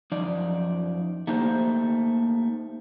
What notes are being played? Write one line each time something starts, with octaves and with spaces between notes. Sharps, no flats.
F#2 F3 D#4 D5
A3 A#3 D#4 G4 C5